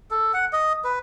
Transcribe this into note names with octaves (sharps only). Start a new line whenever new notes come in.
A4
F#5
D#5
B4